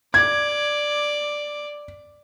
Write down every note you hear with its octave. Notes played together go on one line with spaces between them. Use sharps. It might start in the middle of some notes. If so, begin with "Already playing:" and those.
D5 G#6